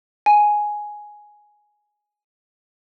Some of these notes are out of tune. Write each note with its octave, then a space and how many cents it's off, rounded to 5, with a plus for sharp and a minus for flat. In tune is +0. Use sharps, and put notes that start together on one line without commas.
G#5 +5